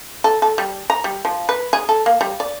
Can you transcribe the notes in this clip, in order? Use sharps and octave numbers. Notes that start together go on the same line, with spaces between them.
A4
A4
G3
A#5
G3
F3
B4
G#4
A4
A#3
G3
D5